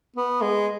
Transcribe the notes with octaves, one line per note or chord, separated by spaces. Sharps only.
B3
G#3